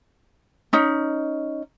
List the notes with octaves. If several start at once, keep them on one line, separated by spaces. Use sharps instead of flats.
C#4 D#4